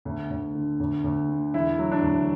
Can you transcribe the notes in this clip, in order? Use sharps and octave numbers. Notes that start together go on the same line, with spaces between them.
D2
D2
D3
D2
D2
D3
E1 E4
F#3
D4
D2